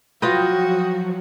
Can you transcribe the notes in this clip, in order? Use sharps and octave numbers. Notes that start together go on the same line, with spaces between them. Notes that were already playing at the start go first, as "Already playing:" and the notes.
F3 F#3 F4 F#4 B4 G5 D#6 A#6